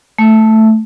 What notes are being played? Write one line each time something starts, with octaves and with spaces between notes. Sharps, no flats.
A3